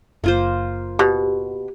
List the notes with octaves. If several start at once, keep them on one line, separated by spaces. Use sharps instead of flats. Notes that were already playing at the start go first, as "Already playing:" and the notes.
F#1 A#3 F4 C5
B2 G4